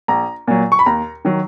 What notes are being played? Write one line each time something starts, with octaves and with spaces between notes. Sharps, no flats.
A#1 A#5
A#2 F#3
C#6
B5
D#2 A#5
D#3 F#3